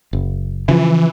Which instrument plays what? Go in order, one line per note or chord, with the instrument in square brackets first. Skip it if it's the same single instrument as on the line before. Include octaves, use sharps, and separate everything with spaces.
[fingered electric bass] F#1
[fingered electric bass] C#3 F3 [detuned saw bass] E3